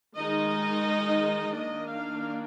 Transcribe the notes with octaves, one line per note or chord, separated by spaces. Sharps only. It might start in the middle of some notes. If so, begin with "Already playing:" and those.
D#3 G#3 D#4 D#5
D#3 A#3 D4 D#5
F5